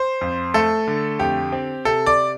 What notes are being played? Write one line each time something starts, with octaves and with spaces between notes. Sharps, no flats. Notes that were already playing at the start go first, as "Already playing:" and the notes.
Already playing: C5
F2
A3 A4
D3
F2 G4
C4
C3 A4
D5